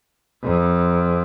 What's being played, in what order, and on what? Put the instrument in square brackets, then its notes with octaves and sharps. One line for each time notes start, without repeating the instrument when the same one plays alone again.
[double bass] F2